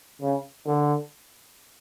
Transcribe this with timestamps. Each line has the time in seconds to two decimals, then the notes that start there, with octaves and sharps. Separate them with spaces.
0.21 C#3
0.66 D3